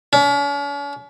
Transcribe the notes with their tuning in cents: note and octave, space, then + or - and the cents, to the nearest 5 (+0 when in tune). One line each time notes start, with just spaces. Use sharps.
C#4 +45